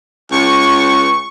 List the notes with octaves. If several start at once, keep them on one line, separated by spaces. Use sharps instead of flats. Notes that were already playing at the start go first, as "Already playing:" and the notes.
C#2 C#6